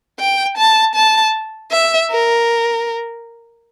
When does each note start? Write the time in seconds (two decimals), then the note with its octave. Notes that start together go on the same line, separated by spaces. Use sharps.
0.19 G5
0.57 A5
0.95 A5
1.72 E5
2.11 A#4